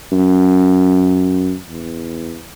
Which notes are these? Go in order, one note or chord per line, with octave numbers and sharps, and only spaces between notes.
F#2
E2